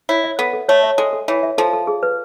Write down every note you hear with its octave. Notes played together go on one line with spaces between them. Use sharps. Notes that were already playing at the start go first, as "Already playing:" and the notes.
E4 C#5
E5
B3 A4
A4
A3 C#5
E5
G#3 A4
A4
E3 C#5
E5
F3 A4
A4
G#4
B4